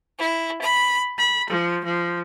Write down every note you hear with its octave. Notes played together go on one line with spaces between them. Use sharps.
E4
B5
B5
F3
F3